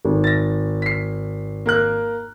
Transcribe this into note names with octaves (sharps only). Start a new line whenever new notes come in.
G#1
A6 A#6
B6 C7
A#3 A#4 F#6